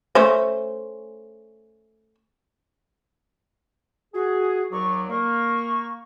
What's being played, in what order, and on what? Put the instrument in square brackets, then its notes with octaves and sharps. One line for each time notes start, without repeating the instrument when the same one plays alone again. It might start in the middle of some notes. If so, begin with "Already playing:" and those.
[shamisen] A3 C#4 C5
[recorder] F#4 [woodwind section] G#4
[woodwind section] D#2 F#3 D5 [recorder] C#6
[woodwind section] A#3 [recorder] C#6